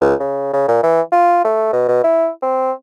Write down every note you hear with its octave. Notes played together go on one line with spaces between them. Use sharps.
C#2
C#3
C#3
A#2
E3
F4
A3
B2
B2
E4
C4